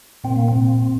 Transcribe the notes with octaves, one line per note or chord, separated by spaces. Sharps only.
A#2 C4
A#3
C4
A#2